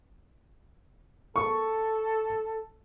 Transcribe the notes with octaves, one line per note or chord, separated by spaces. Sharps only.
A4 C#6